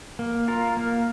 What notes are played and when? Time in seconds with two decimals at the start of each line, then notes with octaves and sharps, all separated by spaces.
0.19 A#3
0.48 F4 A#4
0.77 A#3